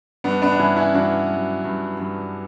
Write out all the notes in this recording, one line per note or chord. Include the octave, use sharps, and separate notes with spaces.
G2 B3 D4
B3 D4
D4
G2 C#4 E4
C#4 E4
G2 D4 F#4
F#3
G2
G2